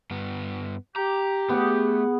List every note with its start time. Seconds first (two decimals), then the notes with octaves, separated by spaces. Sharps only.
0.11 G2 B3
0.96 G4 A#5
1.49 A3 B3 G#4 F#5